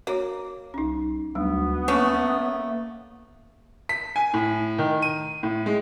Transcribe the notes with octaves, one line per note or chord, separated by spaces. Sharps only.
A#3 F#4 C#5
C2 C#4 D#4
D2 F#3 G3 B3 D4
E3 A3 A#3 C#4
B6
G#5
A2
D#3
D#7
A2
G#3